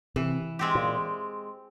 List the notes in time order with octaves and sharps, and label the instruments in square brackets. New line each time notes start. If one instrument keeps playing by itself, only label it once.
[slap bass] C3 [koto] E3
[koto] G#3 C4 G4
[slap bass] A#2